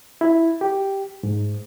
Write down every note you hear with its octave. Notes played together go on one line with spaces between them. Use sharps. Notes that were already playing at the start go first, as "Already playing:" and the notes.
E4
G4
G#2